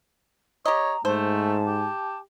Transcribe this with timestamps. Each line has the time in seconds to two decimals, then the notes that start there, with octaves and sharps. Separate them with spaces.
0.65 G4 C#5 D#5 A#5
1.05 G#2 A3 C5 A5
1.66 G4